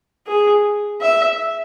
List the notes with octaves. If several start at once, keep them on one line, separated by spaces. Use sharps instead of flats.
G#4
E5